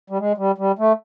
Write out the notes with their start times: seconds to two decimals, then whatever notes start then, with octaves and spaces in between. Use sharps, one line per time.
0.10 G3
0.19 G#3
0.38 G3
0.58 G3
0.79 A3